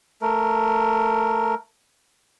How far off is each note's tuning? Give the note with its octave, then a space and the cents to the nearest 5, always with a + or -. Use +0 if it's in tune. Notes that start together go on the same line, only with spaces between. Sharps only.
A3 +10 A#4 +0